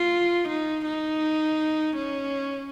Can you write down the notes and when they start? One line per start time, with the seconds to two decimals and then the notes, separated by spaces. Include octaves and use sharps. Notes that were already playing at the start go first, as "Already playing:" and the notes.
Already playing: F4
0.48 D#4
0.85 D#4
1.96 C#4